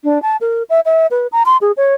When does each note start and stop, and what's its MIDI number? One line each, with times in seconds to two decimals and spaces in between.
0.04 0.21 62
0.22 0.37 81
0.41 0.63 70
0.70 0.80 76
0.85 1.07 76
1.11 1.27 71
1.32 1.43 82
1.46 1.57 84
1.61 1.72 68
1.77 1.94 73